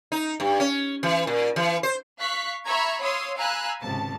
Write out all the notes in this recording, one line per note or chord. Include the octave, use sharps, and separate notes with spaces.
D#4
G2
C#4
E3
A#2
E3
C5
F5 C#6 F#6 B6
E5 A#5 B5 C#6 E6 G#6
C#5 F5 C6 D#6 E6
F5 G#5 A#5 B5 E6 F#6
G#1 C#2 C3 A5